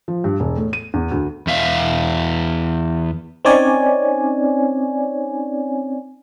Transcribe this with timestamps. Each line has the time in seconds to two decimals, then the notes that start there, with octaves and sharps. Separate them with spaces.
0.08 F3
0.24 G2
0.40 E1
0.57 A2
0.73 D#7
0.94 E2
1.11 D2
1.47 E2 E5 F5
3.45 C4 C#4 D#4 C#5 D5 G#5